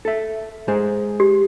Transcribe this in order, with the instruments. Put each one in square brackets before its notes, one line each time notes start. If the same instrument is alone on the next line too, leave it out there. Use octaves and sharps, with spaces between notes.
[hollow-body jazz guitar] A4 E5
G#3 G#4 C5
[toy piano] G4